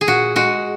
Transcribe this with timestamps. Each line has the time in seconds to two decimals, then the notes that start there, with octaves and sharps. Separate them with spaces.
0.01 G#4
0.07 A#2 F#4
0.36 G#3 F#4